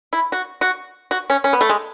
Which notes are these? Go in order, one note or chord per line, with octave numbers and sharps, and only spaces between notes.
E4
F#4
F#4
F#4
C#4
C#4
B3
A3
G#3